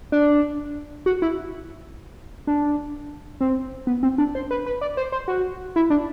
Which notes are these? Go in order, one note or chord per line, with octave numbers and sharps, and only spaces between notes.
D4
F#4
E4
D4
C4
B3
C4
D4
C5
B4
B4
D5
C5
C5
F#4
E4
D4